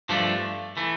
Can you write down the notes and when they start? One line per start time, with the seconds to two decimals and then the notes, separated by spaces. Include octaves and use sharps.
0.09 G2 F3 A3 D4
0.77 E3 A3